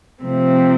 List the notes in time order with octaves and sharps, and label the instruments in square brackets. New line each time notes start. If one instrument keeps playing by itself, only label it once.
[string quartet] C3 F3 A3 C4